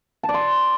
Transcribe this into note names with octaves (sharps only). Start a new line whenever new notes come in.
A5
D5
C6